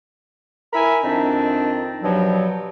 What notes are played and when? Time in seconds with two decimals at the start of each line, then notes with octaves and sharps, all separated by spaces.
0.73 E4 A#4 E5 G#5 B5
1.03 F2 D#3 C4 D4 D#4
2.03 G2 B2 F3 F#3